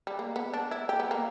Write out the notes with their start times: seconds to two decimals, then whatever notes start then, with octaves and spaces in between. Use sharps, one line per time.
0.07 G3
0.19 A#3
0.36 B3
0.54 D4
0.71 E4
0.89 G4
1.00 B3
1.11 A#3